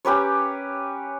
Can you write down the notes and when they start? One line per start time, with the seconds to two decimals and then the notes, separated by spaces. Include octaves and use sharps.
0.05 C#4 G4 B4 C#5